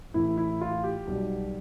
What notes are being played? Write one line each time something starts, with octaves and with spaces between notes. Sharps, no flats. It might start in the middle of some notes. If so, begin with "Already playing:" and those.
A1 A2 E3 E4
E4
F4
G4
B1 B2 G3